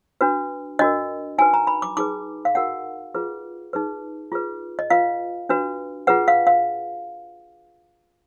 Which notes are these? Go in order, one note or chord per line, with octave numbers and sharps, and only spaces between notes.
D4 F#4 B4
D4 F#4 A#4 D#5
D#4 F#4 B4 G#5
A#5
B5
D6
D#4 G#4 B4 D6
F5
D#4 F#4 A#4 F#5
F4 G#4 B4
D#4 G#4 B4
F4 G#4 B4
D#5
F4 B4 F5
D4 F#4 B4
F4 G#4 B4 F#5
F5
F5